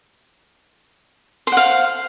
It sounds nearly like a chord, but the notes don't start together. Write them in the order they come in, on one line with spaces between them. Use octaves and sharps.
C5 F#5 F5